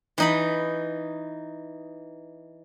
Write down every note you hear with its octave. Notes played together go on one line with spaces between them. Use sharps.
E3 D#4 B5